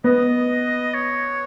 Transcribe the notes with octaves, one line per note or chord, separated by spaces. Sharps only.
B3 D#5
C#5